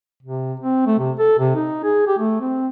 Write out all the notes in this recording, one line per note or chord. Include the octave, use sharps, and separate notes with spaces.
C3
C4
A3
C3
A4
C3
D#4
G#4
G4
A3
C4